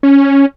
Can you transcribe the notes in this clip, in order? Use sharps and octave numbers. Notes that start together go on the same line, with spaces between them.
C#4